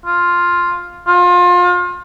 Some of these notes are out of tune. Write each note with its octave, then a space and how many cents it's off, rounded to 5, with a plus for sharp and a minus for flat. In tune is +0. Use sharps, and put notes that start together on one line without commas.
F4 +5
F4 +30